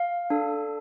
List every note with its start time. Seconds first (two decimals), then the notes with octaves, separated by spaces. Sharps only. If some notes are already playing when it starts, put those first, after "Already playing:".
Already playing: F5
0.30 D4 A4